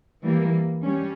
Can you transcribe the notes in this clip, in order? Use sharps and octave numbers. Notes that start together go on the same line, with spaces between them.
E3 G3 A#3
G3 C#4